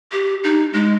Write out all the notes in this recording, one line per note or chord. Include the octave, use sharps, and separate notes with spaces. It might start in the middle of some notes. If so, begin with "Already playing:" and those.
G4
D#4
G#3